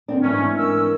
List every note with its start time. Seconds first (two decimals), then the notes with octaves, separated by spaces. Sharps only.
0.08 D3 C4 D4
0.23 G#2 E3 F#3 A3 C#4 D4
0.58 A#4 E6